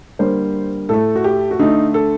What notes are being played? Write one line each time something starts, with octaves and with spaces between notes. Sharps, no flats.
D3 G3 A#3 C5
A2 A3 A4
F#4
G4
F#4
D3 A3 D#4
A4